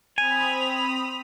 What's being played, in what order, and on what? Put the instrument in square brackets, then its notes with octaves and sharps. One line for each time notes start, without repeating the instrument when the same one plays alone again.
[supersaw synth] C4 B5 D#6 [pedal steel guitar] G#5 [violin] F7